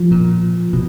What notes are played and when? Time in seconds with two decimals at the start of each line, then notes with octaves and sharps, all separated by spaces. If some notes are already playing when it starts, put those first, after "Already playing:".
Already playing: F3
0.11 A#2
0.73 B2